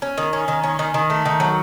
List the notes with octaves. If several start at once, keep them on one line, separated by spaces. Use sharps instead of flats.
C#4
D#3
C#4
D#3
C#4
D#3
D#3
A3
D#3
F#3